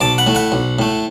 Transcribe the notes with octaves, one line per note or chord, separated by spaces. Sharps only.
B1 A5 D6
F#5 B5
A2 A3
F#5 B5
B1
A2 A3